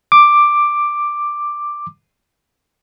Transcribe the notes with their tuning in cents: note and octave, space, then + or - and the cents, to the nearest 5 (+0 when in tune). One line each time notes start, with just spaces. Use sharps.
D6 +5